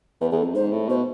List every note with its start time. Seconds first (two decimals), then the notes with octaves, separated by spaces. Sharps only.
0.21 E2 B4
0.32 E2 G#4
0.38 A4
0.43 F2
0.55 G#2 C5
0.72 A2
0.89 B2 C5